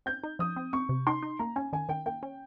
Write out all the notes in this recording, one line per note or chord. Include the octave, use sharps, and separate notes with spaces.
C4 G6
D#4
F3 D#6
C4
C4 C#6
C3
D#4 C6
D#4
A#3 A#5
C#4 G#5
D#3 G#5
D#3 G5
A#3 G5
C#4